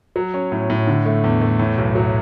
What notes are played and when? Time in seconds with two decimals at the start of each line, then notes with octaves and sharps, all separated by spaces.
0.16 F#3
0.34 C#4
0.52 A2
0.70 A2
0.87 D3
1.05 A3
1.24 E2
1.41 A3
1.59 A2
1.78 B1
1.95 F#3